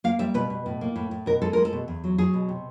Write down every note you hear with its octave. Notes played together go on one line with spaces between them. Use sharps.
A#3 F5
G3 E5
B2 B4
B2
A2
A#3
A2
A2
B2 A#4
G#3 A4
G#3 A#4
A4
B2
E2
F#3
F#3 G#4
B2
C3